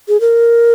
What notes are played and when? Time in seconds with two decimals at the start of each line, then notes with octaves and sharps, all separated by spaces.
0.08 G#4
0.21 A#4